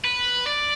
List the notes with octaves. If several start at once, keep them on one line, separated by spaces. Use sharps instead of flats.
B4
D5